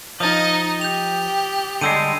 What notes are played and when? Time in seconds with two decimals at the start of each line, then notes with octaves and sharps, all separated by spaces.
0.20 F3 D#4 D#5 D#6 A6
0.81 G4 G6 F7
1.81 D3 G3 G#3 E6 G6 D#7